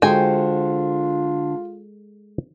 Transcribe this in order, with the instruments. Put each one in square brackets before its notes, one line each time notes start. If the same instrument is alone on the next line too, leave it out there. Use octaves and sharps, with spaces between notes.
[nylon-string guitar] D3 F#4 C5 [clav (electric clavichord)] G#3 A4 [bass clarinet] F4 [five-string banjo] G5 G#5